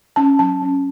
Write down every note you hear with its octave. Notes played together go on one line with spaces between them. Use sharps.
C#4 A5
F#3 A5
C#4 A5